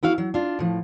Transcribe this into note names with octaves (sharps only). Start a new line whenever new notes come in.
B3 E4 F#4 F5
F#3
D4 F4
A2 F3